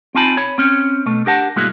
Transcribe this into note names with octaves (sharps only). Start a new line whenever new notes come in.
C4 D#4 F4 G#5 A5 B5
C#5 B5
C4 C#4
B2 A3
D4 G4 A#4 F#5 A5
B1 G2 G#3 A#3 E4 F#4